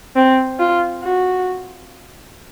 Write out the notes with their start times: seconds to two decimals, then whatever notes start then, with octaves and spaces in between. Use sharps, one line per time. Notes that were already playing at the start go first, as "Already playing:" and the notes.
0.16 C4
0.59 F4
1.03 F#4